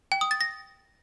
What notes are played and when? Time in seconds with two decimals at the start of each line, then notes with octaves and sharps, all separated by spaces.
0.12 G5
0.21 D#6
0.31 A6
0.41 A#6